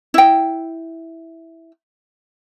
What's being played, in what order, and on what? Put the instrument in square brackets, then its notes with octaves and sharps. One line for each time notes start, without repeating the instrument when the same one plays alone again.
[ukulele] E4 G5